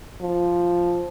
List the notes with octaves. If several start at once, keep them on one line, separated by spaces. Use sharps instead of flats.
F3